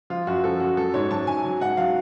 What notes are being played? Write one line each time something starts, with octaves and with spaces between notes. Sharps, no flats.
F3 F4
F#2 F#4
F3 A4
F#2 F#4
F#3 A4
G#2 C#5
F#3 A5
G#2 G#5
F#3
G#2 F#5
F#3 F5